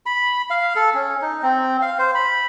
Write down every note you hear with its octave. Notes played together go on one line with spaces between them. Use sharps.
B5
F5
A4
C#4
D#4
C4
F5
C5
B5